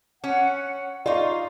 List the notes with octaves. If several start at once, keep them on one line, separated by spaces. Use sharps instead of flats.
C#4 F#5
D#4 F4 D5 F5 C#6